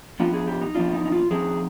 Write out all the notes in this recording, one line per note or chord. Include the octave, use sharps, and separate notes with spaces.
F3 B3 D4 F4
G#4
G4
D#4
F3 B3 D4 F4
D#4
D#4
F4
F3 C4 D#4 G#4